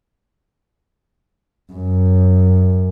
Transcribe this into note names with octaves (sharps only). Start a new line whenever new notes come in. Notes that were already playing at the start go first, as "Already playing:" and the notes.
F#2